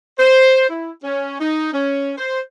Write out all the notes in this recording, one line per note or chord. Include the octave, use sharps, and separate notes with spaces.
C5
E4
C#4
D#4
C#4
C5